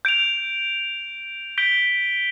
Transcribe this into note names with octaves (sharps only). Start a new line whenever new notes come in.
G6 D7 F7
G6 B6 D7 G7